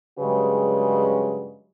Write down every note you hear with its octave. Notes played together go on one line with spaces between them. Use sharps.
G2 C#3 F#3 G#3 G4 B4